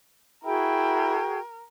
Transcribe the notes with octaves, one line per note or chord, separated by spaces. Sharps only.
E4 F#4 G#4 A#4 G5